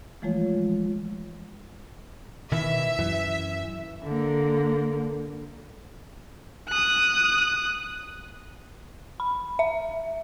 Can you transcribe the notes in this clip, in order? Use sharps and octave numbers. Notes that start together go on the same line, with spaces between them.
E3 F3 G#3 A3 F4 C#5
B2 D#3 E3 E5
F#2 E3
D3 A#3
D#6 F#6
B5
E5